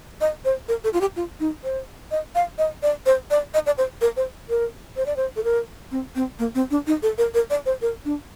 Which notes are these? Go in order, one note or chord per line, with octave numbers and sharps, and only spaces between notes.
D#5
C5
A#4
A4
F4
G4
F4
D#4
C5
D#5
F5
D#5
D5
C5
D5
D#5
D5
C5
A#4
C5
A#4
C5
D5
C5
A4
A#4
C4
C4
A#3
C4
D4
D#4
A4
A#4
A#4
D5
C5
A#4
D4